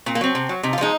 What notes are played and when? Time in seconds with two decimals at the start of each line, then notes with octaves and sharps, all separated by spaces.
0.06 A#2 C4
0.15 A#3
0.21 F#3 C4
0.35 C3
0.49 F#3
0.63 C3 D#4
0.73 F4
0.78 F3 G#3 D#4